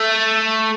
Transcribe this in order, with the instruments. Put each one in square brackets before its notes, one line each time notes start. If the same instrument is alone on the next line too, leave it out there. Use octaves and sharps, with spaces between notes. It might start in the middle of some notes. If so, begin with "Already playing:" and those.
Already playing: [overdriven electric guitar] A3